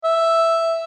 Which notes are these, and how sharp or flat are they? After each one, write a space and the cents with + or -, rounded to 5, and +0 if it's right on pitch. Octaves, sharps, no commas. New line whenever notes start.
E5 +0